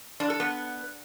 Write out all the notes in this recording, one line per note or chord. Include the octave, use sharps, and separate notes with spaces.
D4
A4
B3